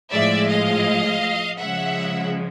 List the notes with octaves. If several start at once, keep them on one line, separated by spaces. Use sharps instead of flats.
A2 F3 G#3 D5 E5
D#5 F5
C#3 F3 G#3 E5 F#5